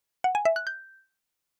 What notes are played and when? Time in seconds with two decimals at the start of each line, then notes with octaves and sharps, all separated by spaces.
0.24 F#5
0.35 G#5
0.45 E5
0.56 F#6
0.67 G6